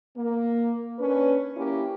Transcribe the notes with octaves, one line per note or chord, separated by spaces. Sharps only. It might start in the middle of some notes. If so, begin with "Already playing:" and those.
A#3
C#4 D4 B4
A#3 C#4 E4 G4